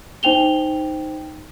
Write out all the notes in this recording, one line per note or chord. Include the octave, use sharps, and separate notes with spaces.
D#4 C5 G5 F7 G7